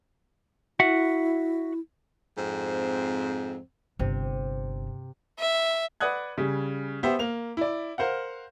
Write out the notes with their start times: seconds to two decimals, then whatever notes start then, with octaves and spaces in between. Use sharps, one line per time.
0.80 E4 F#4 E5 F#5
2.37 F2 G#2 C4
3.99 G1 C3
5.39 E5
6.00 B4 D5 F#5 D#6 F#6 G#6
6.38 C#3 G3
7.03 B3 G4 C5 E5
7.19 A#3 F7
7.57 E4 D5
7.98 A#4 C5 F5 F#5